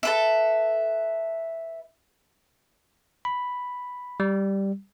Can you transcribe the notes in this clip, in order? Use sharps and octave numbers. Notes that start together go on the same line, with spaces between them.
A4 B4 E5
B5
G3